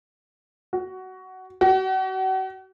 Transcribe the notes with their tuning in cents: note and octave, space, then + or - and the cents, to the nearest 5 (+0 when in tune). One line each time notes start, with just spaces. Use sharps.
F#4 +10
F#4 +35